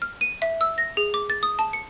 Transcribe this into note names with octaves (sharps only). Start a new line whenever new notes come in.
F6
D#7
E5
E6
A#6
G#4
D6
A6
D#6
A5
C#7